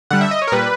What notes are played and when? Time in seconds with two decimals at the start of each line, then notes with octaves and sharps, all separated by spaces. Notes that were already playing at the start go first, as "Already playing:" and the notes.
0.11 D3 G3 F#5
0.21 E5
0.31 D#5
0.42 C#5
0.47 A#4
0.52 A#2 G3 B4